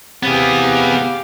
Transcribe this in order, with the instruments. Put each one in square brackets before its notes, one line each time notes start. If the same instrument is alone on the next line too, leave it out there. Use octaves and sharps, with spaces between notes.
[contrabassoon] C3 [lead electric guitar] B3 G#4 [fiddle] G4 F5